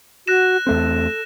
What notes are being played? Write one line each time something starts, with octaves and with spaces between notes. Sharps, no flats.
F#4 F#6 A#6 E7
E2 A3 C4 A4